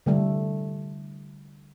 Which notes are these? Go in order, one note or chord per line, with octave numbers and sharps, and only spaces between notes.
D3 G3 A3